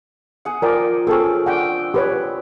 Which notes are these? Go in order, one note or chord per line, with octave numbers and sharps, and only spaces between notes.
G#4 F#5
F3 A#4 D5 G5
C4 C#4 G#4 A4 G5
D4 F#5 G5
G4 B4 C#5